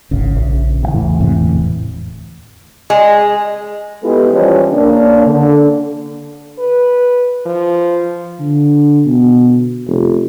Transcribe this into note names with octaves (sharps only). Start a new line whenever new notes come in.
D1 G#1 C#3
A#1
C3 E3
E2 A2 E3
F2 G#2 C3
F1 D2
G#3
G#3 B3 E4 G4 A4
E3 F3 G3 C#4 D#5
C#3 A#3 D4
D3
B4
F3
D3
B2
F1